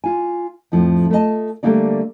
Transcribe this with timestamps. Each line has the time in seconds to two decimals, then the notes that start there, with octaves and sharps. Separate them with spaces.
0.04 F4 G#5
0.72 F2 A2 F3
1.10 A3 F4 A#4 D#5 A5
1.63 D3 G3 A3 A#3 D#4 D5